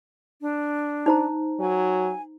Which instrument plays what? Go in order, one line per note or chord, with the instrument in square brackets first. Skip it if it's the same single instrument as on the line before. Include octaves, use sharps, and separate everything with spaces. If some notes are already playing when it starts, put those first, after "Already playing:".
[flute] D4
[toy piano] D#4 C5 A#5
[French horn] F#3 [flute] G#5